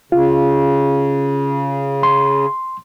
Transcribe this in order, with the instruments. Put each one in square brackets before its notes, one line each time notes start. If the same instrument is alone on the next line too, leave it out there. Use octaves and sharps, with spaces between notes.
[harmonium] C#3 [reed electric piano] F4
[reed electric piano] C6